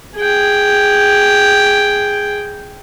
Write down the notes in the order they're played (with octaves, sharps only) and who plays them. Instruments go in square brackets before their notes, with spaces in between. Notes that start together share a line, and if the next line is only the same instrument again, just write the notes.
[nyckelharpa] G#4 G5